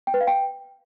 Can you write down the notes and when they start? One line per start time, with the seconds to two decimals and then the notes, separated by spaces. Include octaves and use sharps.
0.07 G5
0.14 B4
0.21 F5
0.27 G5